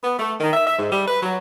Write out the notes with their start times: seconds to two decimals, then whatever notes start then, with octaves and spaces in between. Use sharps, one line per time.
0.04 B3
0.19 A3
0.40 D#3
0.53 E5
0.67 E5
0.79 G#2
0.92 G3
1.07 B4
1.23 F#3